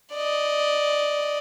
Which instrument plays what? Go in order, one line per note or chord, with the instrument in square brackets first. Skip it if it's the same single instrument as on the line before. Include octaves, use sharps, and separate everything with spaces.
[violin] D5 D#5